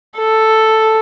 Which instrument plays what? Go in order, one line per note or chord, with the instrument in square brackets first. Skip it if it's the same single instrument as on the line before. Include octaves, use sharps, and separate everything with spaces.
[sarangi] A4